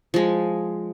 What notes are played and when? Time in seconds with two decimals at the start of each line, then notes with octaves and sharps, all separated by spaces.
0.14 F3 G#3